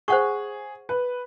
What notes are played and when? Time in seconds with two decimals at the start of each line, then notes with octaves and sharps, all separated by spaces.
0.08 G#4 C5 F#5 C#6
0.89 B4